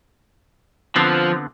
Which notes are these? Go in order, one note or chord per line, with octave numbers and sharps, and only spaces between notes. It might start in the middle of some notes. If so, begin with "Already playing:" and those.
D3 F3 B3 C4